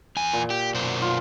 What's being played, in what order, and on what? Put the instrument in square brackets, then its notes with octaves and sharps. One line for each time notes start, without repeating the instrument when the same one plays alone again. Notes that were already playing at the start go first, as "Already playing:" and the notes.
[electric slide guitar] E2 G#5
[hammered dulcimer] A#2
[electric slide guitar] G4
F#2 B2 C5
[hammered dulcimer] F4